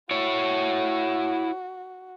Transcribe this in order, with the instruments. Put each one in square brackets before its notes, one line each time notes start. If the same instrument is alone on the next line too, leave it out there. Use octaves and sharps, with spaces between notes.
[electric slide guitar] E4 C#5 [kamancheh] F#4